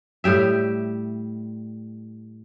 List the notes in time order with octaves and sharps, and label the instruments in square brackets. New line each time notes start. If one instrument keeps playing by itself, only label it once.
[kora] A2 G3 G4 E5